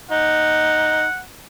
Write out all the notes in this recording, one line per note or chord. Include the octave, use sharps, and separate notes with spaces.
D#4 F#5